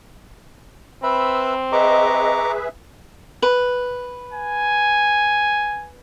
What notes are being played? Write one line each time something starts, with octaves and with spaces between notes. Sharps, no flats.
C4 B4 E5 B5
G#4 B4 D#5 E5 A#5 C#6 D6
B4
G#5